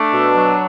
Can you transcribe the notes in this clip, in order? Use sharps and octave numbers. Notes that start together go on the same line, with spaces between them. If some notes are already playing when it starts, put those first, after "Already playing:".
Already playing: A3 D4
B2
F#3